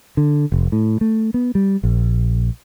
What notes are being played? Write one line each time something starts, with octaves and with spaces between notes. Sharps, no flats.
D3
F1
A2
A3
B3
G3
A#1